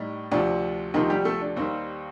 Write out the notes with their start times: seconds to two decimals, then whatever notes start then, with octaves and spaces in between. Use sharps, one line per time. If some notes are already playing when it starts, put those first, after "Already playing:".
Already playing: A2 G3 D#4
0.31 D2 C3 F3 D4
0.94 D2 C3 D#3 F3 D#4
1.10 G3 G4
1.25 A3 A4
1.42 D4
1.56 D#2 D#3 G3 C4